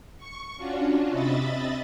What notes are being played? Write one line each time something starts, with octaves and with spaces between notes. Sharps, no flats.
C#6
C#4 D4 F4 F#4
C3 D#5 E5 B5 A6